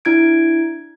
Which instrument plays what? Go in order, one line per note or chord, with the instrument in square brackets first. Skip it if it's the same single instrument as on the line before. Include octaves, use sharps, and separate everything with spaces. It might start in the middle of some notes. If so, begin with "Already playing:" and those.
[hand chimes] D4 E4 G#6 D7